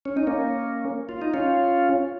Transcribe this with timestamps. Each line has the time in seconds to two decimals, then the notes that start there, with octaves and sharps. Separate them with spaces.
0.05 C#4
0.17 D#4
0.27 A#3 C#4
1.09 F4
1.22 D#4
1.34 C#4 F4